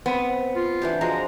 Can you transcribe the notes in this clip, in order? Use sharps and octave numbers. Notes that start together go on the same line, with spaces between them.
B3 C4
F4
E3 D4 G4
F3 G#3 F#4 A#5